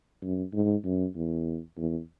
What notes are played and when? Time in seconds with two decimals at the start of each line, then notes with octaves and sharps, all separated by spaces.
0.22 F#2
0.53 G#2
0.85 F#2
1.15 E2
1.78 E2